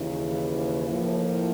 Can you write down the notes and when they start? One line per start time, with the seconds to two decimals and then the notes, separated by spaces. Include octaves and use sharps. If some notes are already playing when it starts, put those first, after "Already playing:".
Already playing: D#2 C#3 E3
0.89 A2 F3 A#3